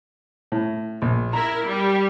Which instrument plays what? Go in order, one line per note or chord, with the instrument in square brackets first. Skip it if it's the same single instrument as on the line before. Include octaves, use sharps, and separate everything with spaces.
[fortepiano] A2
A#1
[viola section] E4 A#4 [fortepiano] A#5
[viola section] G3